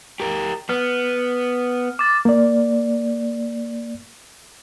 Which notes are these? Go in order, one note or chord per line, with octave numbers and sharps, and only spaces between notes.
G4 A#4
B3 F6
D6 A6
A#3 D5